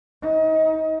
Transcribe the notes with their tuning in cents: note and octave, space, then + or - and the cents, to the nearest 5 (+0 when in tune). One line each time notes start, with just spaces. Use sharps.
D#4 +30